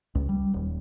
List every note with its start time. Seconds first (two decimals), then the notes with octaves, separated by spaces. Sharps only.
0.15 C#2
0.29 G3
0.54 D#1